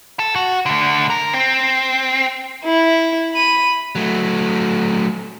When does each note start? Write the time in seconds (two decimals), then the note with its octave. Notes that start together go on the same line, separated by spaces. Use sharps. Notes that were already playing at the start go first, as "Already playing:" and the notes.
0.19 A4
0.35 F#4
0.66 D2 D3
1.10 A#4
1.33 C4
2.65 E4
3.32 B5 D#7
3.95 F#3 A3